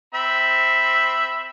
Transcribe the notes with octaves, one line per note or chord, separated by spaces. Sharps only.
C4 E5 B5